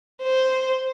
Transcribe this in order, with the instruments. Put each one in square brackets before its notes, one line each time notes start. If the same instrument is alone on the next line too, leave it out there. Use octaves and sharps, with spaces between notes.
[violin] C5